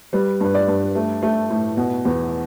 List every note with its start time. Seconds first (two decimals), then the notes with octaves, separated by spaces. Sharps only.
0.13 G3 B4
0.40 G2 B4
0.54 D5
0.68 G2
0.95 A3
1.23 A3
1.50 A2
1.77 B2
2.05 E2